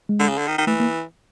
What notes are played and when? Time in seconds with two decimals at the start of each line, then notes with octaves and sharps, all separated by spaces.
0.09 G#3
0.19 D3
0.29 C#3
0.38 D3
0.48 D#3
0.58 D#3
0.67 E3 A3
0.80 A#3